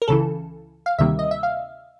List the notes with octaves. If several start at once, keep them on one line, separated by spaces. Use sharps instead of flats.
A#4
C#2 C#3 E3 A4
F5
D2 C3 D#3 G3 A#3 E5
D#5
E5
F5